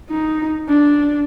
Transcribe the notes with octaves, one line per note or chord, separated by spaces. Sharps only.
D#4
D4